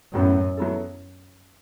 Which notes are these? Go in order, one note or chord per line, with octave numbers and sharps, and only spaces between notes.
F#2 A2 F#3 B3
F#3 B3 E4 A4